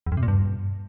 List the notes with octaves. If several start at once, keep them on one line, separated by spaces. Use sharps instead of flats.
E2
F2
C3
A#2
G2